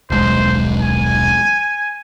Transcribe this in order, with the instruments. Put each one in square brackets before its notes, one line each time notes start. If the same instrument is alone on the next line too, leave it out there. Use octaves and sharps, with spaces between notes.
[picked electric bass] D#1 B1 G#3 [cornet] C5
[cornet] G#5